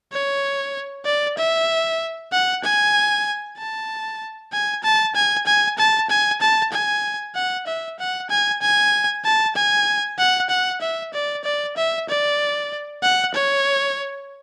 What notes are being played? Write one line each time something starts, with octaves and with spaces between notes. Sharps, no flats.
C#5
D5
E5
F#5
G#5
A5
G#5
A5
G#5
G#5
A5
G#5
A5
G#5
F#5
E5
F#5
G#5
G#5
A5
G#5
F#5
F#5
E5
D5
D5
E5
D5
F#5
C#5